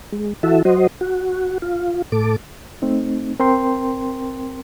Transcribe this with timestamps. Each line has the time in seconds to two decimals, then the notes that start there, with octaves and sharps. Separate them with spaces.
0.12 G#3
0.43 E3 E4 F#4 A4 E5
0.65 F#3 F#4 C5 D#5
1.01 F#4
1.62 F4
2.12 A2 A4 D6
2.82 A3 C4 D#4
3.39 C4 A#4 G5 C6